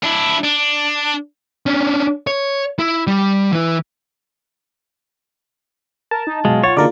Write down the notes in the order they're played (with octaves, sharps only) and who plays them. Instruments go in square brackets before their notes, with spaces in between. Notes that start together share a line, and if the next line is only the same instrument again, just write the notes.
[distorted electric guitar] D4 E4
D4
[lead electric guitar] C#4 D4
C#5
E4
G3
E3 E4
[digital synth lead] A#4 [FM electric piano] A5
[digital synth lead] D#4
[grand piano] B2 F#3 [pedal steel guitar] G#3 [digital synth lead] F4
[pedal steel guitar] C#5 [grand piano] F#5 A6
[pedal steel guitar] D3 [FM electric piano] A#3 A#4 D5 [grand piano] D#4 F#4 G#4